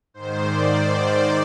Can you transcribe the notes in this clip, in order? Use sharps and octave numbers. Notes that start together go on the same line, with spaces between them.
G#2 D#3 C5
D5
D5